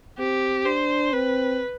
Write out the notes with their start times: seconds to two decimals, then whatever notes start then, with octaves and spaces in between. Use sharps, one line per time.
0.18 C4 G4
0.66 D4 C5
1.13 C4 B4